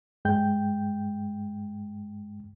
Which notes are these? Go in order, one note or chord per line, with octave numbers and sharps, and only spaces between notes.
G2 G#3 G5 G6